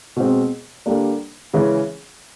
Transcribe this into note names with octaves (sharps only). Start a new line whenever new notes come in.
B2 G#3 C4
D3 G3 A#3 D4
C#3 E3 G#3 C#4